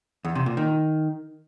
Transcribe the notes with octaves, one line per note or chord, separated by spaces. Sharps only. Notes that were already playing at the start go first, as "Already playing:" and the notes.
E2
C3
A#2
D#3